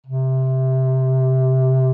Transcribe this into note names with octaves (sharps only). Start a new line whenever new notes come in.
C3